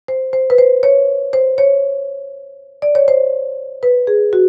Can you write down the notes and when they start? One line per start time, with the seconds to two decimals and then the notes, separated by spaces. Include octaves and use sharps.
0.08 C5
0.33 C5
0.50 B4
0.58 C5
0.83 C#5
1.33 C5
1.58 C#5
2.82 D5
2.95 C#5
3.08 C5
3.83 B4
4.07 G#4
4.33 F#4